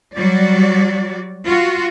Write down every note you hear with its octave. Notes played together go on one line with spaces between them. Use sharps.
F#3 G3 F#4 D5
F4 F#4